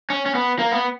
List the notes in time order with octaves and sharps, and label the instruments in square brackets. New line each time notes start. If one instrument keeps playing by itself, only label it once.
[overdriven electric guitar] C#4
C#4
B3
A#3
B3